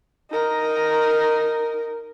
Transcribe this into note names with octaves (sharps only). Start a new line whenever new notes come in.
D#4 A#4